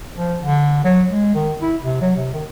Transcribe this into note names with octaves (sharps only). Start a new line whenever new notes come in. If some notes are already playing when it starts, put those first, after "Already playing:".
F3
D3
F#3
G#3
D#3
E4
C3
F#3
C3
D#3